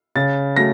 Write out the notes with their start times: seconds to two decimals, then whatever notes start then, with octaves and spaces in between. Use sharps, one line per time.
0.15 C#3 A6
0.56 F#3 A3 A#6